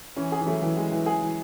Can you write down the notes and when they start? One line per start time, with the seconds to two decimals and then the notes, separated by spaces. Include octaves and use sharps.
0.16 E3 C#4
0.32 G#4
0.41 E3
0.47 F#3 A3
0.62 E3
0.77 E3 G#3
0.92 E3
1.06 G#4
1.22 E3